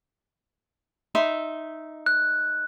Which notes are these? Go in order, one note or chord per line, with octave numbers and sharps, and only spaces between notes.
D#4 E5 C6
F#6